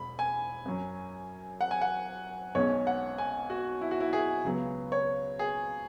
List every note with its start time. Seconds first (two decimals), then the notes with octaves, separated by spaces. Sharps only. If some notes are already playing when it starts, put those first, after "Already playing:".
Already playing: E1 B5
0.19 G#5
0.65 F#2 F#3 C#4
1.61 F#5
1.71 G#5
1.81 F#5
2.55 B1 B2 G#3 C#4 C#5
2.87 F#5
3.18 G#5
3.50 F#4
3.81 E4
3.91 F#4
4.00 E4
4.13 G#4
4.44 C#2 C#3 F#3 B3
4.92 C#5
5.39 G#4